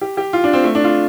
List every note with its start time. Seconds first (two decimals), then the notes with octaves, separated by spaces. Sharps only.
0.01 G4
0.17 G4
0.33 F4
0.44 D4
0.53 C4
0.64 A3
0.75 D4
0.84 F4